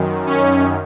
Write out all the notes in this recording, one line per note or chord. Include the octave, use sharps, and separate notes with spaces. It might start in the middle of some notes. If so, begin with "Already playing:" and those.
Already playing: F#2 D#3
C#4